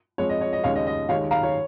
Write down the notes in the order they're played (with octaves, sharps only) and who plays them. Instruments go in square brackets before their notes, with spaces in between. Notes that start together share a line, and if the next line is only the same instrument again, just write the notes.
[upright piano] F2 F3 G#3 C#5
D#5
C#5
D#5
D#2 C#3 G#3 C#5 F5
D#5
D#5
D#2 D#3 G#3 C#5 F5
F5 A#5
C#5